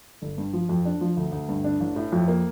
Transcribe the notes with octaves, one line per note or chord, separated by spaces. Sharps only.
G1
G2
F3
F2
D4
F3
D2
D2
G2
D4
A1
A2
F2
A#3